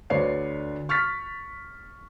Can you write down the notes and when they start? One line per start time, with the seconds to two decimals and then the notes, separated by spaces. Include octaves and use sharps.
0.10 D2 D3 B4 C#5 D5 C7
0.89 C#6 F6 A6 B6